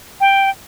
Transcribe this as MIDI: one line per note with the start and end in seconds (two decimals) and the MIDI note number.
0.20 0.49 79